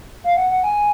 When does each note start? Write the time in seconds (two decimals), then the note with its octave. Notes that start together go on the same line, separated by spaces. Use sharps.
0.24 F5
0.37 F#5
0.51 F#5
0.64 G#5